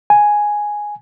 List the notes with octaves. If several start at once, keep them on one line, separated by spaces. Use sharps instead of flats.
G#5